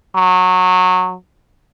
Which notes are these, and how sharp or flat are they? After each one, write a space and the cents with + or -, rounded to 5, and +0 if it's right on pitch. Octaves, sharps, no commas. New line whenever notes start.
F#3 -15